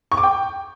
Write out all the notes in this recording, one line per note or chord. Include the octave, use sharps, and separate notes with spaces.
C#6
D6
G5